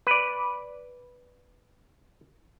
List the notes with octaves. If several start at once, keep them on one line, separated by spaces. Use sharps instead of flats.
B4 D5